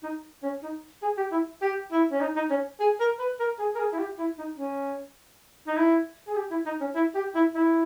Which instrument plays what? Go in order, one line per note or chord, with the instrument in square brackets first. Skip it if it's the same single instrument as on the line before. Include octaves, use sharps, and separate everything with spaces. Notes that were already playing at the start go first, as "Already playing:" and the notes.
[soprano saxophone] D#4
C#4
D#4
G#4
G4
E4
G4
E4
C#4
D#4
D#4
C#4
G#4
A#4
B4
A#4
G#4
A#4
G#4
E4
G4
E4
D#4
C#4
D#4
E4
G#4
G4
E4
D#4
C#4
E4
G4
E4
E4